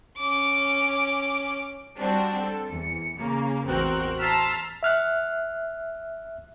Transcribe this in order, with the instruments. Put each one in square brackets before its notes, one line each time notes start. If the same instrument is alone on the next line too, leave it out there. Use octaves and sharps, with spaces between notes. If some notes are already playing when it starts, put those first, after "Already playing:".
[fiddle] C#4 D6
[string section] G3 C4 D4 F#4
A4
E2 C#7
C#3 A#3
A1 E2 C4 F#4 A#4 F#6
A5 A#5 C6 E6 F6 B6
[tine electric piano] E5 F6 F#6